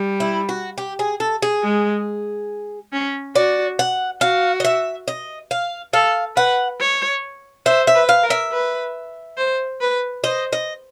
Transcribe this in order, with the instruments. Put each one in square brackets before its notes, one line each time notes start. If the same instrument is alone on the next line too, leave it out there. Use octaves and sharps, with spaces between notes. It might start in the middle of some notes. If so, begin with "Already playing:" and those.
Already playing: [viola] G3
[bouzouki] E4
F#4
G4
G#4
A4
G#4
[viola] G#3
C#4
[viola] F#4 [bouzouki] D5
[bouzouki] F#5
[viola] F#4 [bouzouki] F5
[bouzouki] D#5
E5
D#5
F5
[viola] A4 [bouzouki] F5
[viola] B4 [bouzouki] F#5
[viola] C#5
[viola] C5 [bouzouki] E5
[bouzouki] E5
[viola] B4
[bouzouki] F5
[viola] A#4
[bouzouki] E5
[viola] B4
C5
B4
[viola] C5 [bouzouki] D#5
[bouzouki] D#5